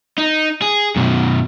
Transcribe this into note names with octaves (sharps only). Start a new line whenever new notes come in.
D#4
G#4
F#2 B2